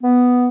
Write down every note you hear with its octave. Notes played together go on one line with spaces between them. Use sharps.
B3